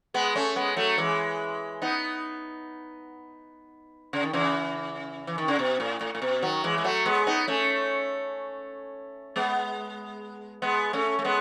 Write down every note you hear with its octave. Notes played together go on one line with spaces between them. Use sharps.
G#3 B3
A3 C#4
G#3 B3
F#3 A3
E3 G#3
B3 D#4
C#3
D#3
C#3 E3
E3
D#3
C#3
B2
A2
A2
A2
B2
D#3 F#3
E3 G#3
G#3
F#3 A3
G#3 B3
B3 D#4
A3 C#4
G#3 B3
G#3 B3
A3 C#4
A3
G#3 B3